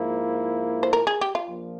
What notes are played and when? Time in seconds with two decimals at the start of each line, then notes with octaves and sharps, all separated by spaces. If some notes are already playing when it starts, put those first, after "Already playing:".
Already playing: G#2 F3 A#3 E4
0.83 C5
0.93 A#4
1.07 G#4
1.21 G4
1.35 F4
1.49 A#1 A#2 F3